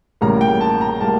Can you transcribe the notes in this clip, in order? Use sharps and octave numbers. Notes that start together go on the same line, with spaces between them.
A1 A2 G3 A#3 A#5
G5
A5
A#5
A2 G3 A#3 A5